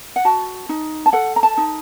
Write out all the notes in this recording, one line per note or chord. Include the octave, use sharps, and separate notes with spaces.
F#5
F#4 A5
D#4
A5
A4 F#5
A#5
A5
D#4